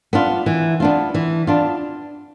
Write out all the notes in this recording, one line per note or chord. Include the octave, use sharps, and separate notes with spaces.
B3 D4 F4
E3
B3 D4 F4
E3
B3 D4 F4